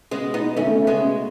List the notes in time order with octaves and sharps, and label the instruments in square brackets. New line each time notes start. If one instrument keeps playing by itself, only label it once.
[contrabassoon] C#3 [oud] G#3 B3
[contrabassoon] B2
[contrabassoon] A2 [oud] B3 D#4
[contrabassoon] B2
[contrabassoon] D#3 [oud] A3 C#4
[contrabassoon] C#3
B2
C#3
[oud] G#3 B3
[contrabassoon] C#3
B2